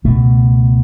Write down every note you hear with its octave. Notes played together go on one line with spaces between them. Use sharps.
C#2 B2 A3